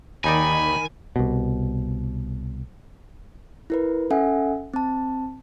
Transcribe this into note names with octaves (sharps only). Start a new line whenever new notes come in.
D#2 D#3 D#4 D5 G#5 B5
C2 B2
E4 A#4 B4
C#4 A4 E5 F#5 G#5
C4 A5